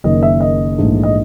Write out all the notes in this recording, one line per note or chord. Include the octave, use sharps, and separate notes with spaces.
F#1 F#2 D#3 D#5
E5
D#5
A#1 G#2 E3 A3 D4
D#5